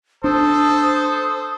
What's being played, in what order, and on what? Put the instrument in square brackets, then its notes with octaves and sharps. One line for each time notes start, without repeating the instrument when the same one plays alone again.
[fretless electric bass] D4 [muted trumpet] A4 [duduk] C5 [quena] D#6